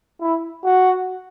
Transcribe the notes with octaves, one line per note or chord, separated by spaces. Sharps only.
E4
F#4